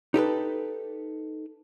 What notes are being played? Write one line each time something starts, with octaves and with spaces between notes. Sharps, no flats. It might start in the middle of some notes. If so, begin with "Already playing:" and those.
D#4 G4 A4 B4